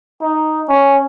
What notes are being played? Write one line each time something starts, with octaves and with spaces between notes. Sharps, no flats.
D#4
C#4